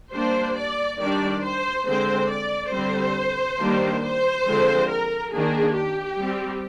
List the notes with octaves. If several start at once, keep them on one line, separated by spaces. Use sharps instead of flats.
G3 A#3 D4 C5
D5
D#3 G3 D4 D5
C5
D3 G#3 C4 C5
D5
D3 G3 C4 C5
D#3 G3 A#3 D4
C5
D3 F3 G#3 C4
A#4
D#3 A#3 D4 G#4
G4
G3 C4